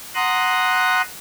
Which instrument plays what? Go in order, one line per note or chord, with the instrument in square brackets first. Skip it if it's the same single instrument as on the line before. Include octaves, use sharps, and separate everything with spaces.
[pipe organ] F#5 A#5 C6 D#6 F#6